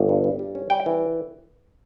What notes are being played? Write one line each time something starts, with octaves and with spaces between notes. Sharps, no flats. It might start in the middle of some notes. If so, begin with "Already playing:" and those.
Already playing: G1
G2
G2
G3
C#4
G3 G5
E3